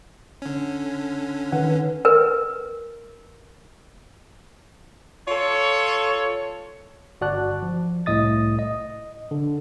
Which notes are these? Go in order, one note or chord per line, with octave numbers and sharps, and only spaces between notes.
D3 C#4
D#3 B4 F#5
A#4 B4
F4 A4 C#5
G1 F#4 D5 A5 F#6
F3
C2 A2 D#5 D#6 A6
D#5
D3